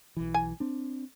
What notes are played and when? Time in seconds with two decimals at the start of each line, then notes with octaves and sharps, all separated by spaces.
0.17 B1 E3
0.34 G#5
0.60 C4 D4